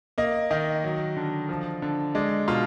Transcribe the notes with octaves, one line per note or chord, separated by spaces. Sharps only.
A#3 D#5
D#3 D#5
F#3
D3
F3
D3
G#3 D5
B2 F4